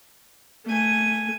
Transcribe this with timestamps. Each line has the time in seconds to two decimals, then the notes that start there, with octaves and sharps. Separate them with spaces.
0.65 A3 G#5